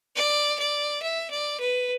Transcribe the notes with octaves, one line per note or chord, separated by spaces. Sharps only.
D5
D5
E5
D5
B4